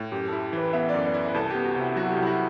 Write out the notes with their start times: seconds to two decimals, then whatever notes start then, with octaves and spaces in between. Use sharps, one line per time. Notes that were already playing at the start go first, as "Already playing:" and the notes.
Already playing: A2
0.11 F#2 G4
0.28 E4 A4
0.53 E3 B4
0.73 B3 E5
0.89 F#2 D5
1.05 D5
1.14 E4
1.28 B4
1.34 C2 A4
1.50 B3 G4
1.65 F#4
1.76 C3 E4
1.96 F#3 F#4
2.11 G4
2.17 C2
2.22 E4
2.26 F#4